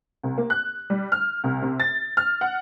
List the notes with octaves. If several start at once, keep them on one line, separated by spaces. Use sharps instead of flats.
C2
A#3
F#6
G3
F6
C2
C3
A6
F6
F#5